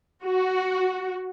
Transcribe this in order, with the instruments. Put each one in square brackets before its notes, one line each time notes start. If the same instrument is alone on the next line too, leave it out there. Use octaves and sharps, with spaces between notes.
[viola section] F#4